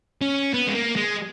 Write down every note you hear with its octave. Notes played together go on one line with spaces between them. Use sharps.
C#4
B3
G#3
A#3
G#3